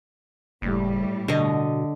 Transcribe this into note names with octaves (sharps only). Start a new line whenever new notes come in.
F#1 A2 G3
B2 D3 D#5